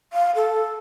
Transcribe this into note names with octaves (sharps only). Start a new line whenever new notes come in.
F5
A4